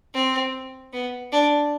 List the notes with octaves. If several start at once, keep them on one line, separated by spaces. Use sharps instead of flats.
C4
B3
D4